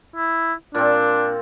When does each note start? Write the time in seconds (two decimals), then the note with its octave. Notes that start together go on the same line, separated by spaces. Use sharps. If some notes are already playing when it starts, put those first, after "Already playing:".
0.16 E4
0.75 A#2 C4 D4